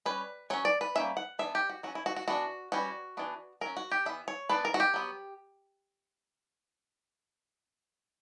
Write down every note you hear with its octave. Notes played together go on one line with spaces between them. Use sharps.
G3 C#4 B4
F#3 C#4 C#5
D5
B4
G3 A#3 C#4 E5
F#5
E3 B3 D4 E5
G4
F#4
F#3 C#4 F#4
E4
F#4
F#4
E3 B3 D4 F#4
E3 G3 C#4 F#4
E3 B3 D4
F#3 C#4 A#4
F#4
G4
E3 B3 D4 E5
C#5
E3 B3 D4 B4
A#4
F#4
G4
F#3 B3